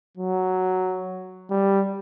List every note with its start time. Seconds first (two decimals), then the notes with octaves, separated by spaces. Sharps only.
0.17 F#3
1.51 G3